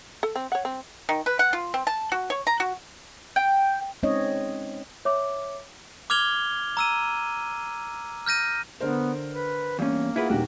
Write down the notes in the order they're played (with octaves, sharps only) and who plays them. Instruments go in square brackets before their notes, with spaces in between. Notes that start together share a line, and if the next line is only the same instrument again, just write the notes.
[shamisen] A4
C4
C#5 F#5
C4
[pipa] D#3
B4
F#5
F4
C4
A5
F#4
C#5
A#5
F#4
[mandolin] G5
[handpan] G#3 C4 C#4 D#4 C#5 D#5
[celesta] C#5 E5 D6
[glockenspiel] D6 F6 G#6 F7 G7
A#5 E6 D#7
F6 G6 A#6 D#7
[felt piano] D3 A#4 C5 [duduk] B3
[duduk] B4
[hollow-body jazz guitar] E2 G2 C#4 [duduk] A#3
[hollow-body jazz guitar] E4 B4 [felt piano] F4 G#4 F#5
[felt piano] D#1 D#3 [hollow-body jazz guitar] F#4 G4